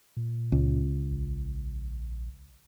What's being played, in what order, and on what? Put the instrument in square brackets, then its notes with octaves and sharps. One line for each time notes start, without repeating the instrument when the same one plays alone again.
[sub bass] A#2
[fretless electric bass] C#2
[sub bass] A#1